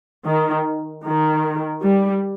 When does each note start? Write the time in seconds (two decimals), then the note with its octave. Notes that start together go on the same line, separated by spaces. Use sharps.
0.25 D#3
1.04 D#3
1.83 G3